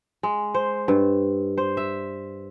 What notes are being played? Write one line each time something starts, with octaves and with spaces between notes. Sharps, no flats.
G#3
C5
G2
C5
E5